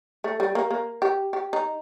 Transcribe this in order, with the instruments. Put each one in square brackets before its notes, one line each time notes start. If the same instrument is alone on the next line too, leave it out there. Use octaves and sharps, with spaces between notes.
[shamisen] A3
G3
A#3
A#3
G4
G4
D#4